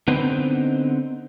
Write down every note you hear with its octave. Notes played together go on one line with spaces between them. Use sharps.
D3 B3 C4 D#4 B4 C5